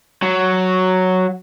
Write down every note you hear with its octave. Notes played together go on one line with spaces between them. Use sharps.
F#3